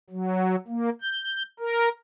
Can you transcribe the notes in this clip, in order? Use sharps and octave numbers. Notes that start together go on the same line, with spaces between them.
F#3
A#3
G6
A#4